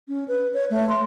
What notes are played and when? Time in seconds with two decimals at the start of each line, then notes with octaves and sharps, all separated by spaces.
0.08 C#4
0.28 B4
0.54 C#5
0.70 A3
0.89 C6